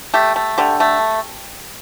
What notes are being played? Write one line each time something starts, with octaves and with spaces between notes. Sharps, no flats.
A3 G4
A3
D3 G4
A3